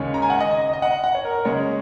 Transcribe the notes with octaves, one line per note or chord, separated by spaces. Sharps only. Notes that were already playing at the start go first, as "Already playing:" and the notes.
Already playing: D#2 C#3 G#3 C#4
A#5
G#5
F#5
D#5
D#5
D#5
D#5
F#5
F#5
C#5
A#4
A#4
C#3 G#3 C#4 C#5